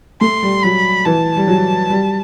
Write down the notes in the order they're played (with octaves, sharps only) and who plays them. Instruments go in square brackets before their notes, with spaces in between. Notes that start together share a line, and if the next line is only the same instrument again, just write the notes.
[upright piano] A3 [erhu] C6
[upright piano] G3
[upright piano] F#3 [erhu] B5
[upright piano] E3 [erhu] A5
[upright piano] G3
F#3
G3